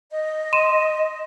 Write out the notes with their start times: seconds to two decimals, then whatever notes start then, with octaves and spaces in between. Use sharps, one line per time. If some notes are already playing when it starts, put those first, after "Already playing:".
0.10 D#5
0.53 C6 D#7 E7